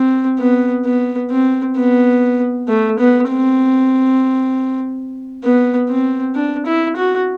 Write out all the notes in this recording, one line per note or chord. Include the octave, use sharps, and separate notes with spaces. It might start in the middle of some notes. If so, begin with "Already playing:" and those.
Already playing: C4
B3
B3
C4
B3
A3
B3
C4
B3
C4
D4
E4
F#4